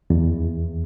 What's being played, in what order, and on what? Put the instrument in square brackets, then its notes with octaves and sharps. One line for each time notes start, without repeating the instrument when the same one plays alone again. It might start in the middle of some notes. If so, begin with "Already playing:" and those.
[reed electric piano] E2